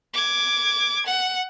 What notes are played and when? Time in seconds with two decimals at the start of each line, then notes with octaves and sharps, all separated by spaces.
0.14 D6 G#6
1.06 F#5